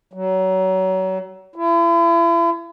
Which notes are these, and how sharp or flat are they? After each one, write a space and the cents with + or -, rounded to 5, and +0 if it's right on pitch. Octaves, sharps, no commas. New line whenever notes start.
F#3 +30
E4 +40